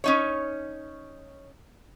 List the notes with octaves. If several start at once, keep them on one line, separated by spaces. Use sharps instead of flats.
C#4 D#4 C#5